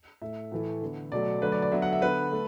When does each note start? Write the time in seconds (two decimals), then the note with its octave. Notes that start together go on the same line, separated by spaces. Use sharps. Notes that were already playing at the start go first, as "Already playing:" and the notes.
0.22 A2 A3 E5
0.52 A2 E3 A3
0.82 D3 B3
1.12 B2 F#3 A3 D5
1.42 D3 F#3 A3 B4
1.52 D5
1.62 D5
1.72 D3 F#3 B3 E5
1.82 F#5
1.93 E5
2.02 D3 B3 B4
2.32 A3